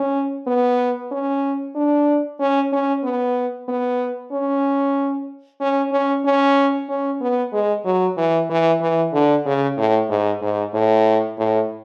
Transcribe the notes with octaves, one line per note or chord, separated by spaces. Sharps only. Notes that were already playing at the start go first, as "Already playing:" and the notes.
Already playing: C#4
B3
C#4
D4
C#4
C#4
B3
B3
C#4
C#4
C#4
C#4
C#4
B3
G#3
F#3
E3
E3
E3
D3
C#3
A2
G#2
G#2
A2
A2